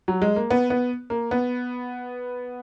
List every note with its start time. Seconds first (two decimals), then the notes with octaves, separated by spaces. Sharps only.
0.08 F#3
0.22 G#3
0.36 A#3
0.50 B3
0.70 B3
1.10 A#3
1.31 B3